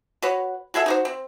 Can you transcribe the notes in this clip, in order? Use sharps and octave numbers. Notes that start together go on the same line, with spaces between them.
F#4 B4 C#5
F#4 G#4 A4 E5
D#4 F#4 C5
C4